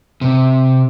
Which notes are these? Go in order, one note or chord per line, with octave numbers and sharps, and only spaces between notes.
C3